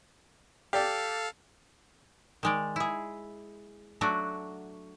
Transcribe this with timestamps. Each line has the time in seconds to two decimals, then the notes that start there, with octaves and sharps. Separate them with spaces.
0.73 G4 A4 D5 F5
2.43 D#3 G#3 D5
2.76 E4 G#4
4.01 F#3 A3 D4 F#4